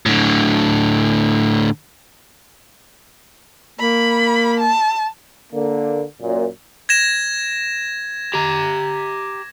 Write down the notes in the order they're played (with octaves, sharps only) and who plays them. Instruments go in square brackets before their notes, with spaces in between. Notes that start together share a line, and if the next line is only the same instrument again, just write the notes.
[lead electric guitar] A2 D3
[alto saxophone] A#3 [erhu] B5
[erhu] A5
[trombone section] D3 A#3
F#2 A#2
[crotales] G#6 A#6 E7
[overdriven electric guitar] G4 A#5